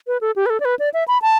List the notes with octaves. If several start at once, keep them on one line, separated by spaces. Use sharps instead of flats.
B4
A4
G4
B4
A4
D5
B4
D5
E5
B5
A5